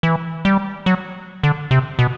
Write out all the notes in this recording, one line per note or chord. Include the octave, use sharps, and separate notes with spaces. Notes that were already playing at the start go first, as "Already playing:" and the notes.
E3
G3
F#3
D3
C3
B2